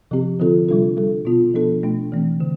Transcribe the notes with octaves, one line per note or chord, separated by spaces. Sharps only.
C3 F3 C4 G4
D3 F3 C4 F4 A4
C3 G3 D4 F4 A4
G3 D4 A4
B2 B3 F4
F3 B3 D4 A4
B2 A3 D4
E3 A3 C4
D3